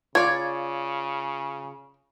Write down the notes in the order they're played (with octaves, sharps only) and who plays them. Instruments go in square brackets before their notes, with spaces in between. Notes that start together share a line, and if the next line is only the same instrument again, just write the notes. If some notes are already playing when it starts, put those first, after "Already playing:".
[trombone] C#3 [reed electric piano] F4 [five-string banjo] C#5 D5 [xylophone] G#6